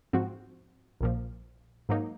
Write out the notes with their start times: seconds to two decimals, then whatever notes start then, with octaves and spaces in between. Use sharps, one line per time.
0.13 G#2 F3 C4 F#4
1.01 A#1 A#2 F3
1.89 G#2 F#3 A#3 D#4